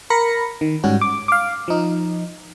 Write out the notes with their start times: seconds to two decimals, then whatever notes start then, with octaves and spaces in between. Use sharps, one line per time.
0.10 A#4 B5 A#6 C#7
0.61 D#3
0.84 G#2 G3 C#4 F#4
1.01 D6
1.28 F5 D6
1.68 F3 D#4